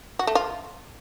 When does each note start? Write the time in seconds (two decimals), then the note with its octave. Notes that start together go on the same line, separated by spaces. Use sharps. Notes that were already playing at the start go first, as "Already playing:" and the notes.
0.19 F#4
0.27 A3
0.35 F4